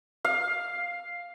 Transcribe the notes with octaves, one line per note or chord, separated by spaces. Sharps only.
F5